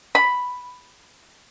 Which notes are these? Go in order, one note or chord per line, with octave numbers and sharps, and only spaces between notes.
B5